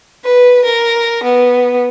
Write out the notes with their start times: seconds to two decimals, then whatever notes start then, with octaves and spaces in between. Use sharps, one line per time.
0.23 B4
0.65 A#4
1.23 B3